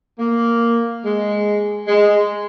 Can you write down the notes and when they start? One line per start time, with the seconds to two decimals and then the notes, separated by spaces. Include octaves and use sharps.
0.19 A#3
1.04 G#3
1.88 G#3